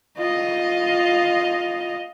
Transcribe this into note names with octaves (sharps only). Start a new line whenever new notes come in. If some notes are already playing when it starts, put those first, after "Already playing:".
F4 D#5